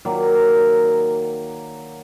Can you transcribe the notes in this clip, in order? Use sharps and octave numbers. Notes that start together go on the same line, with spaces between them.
D#3 F#3 A#3 D5